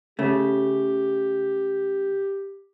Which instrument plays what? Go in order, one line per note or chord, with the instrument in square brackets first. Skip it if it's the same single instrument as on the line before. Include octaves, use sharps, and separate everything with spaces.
[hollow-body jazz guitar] C#3 A3 [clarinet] G4